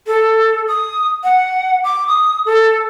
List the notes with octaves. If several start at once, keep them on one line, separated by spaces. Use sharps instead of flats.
A4
D#6
F#5
D6
D#6
A4